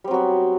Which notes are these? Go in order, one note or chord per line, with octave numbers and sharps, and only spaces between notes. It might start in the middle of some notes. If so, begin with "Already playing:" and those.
F#3 G3 B3 C4